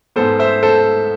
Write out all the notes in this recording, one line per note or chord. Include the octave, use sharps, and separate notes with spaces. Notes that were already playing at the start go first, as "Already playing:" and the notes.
G#2 G#3 B3 A4 C5
C5 E5
A4 C5